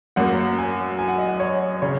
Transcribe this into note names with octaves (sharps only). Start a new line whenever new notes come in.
F#2 F#3 A#3 F#5
G#5
G#5
F#5
D#5
F#5
C#5
C#3 C#5